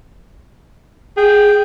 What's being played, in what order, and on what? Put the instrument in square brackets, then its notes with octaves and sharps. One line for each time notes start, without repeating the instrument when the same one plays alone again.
[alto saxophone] G#4 [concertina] G5